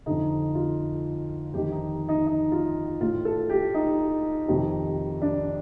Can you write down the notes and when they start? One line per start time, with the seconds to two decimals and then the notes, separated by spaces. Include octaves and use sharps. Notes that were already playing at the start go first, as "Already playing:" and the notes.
0.06 F2 D3 D#4
0.55 F4
1.53 F2 D#3 G4
1.72 D#4
2.09 D#4
2.27 D#4
2.52 F4
3.01 A2 F4
3.25 A4
3.50 G4
3.74 D#4
4.48 F2 C3 D#3
5.22 D4